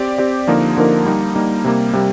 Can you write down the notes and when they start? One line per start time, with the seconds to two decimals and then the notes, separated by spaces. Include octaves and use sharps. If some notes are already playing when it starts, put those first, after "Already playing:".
Already playing: C4 G4 D5
0.18 C4 G4 D5
0.47 D3 F3 A#3 D#4 A#4
0.77 D3 F3 A#3 D#4 A#4
1.05 G3 A#3 D#4
1.35 G3 A#3 D#4
1.64 C3 G3 A#3
1.93 C3 G3 A#3